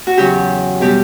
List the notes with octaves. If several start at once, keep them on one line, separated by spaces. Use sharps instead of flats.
F#4
E2 C#3 F#3 G4
B2 G3 G4